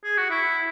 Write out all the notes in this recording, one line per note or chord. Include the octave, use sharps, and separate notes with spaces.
G#4
F#4
E4